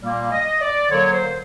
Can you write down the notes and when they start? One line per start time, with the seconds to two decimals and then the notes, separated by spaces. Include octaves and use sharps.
0.02 A#2 G3 A#3
0.32 D#5
0.62 D5
0.90 D3 F#3 A#3 C#5
1.12 C5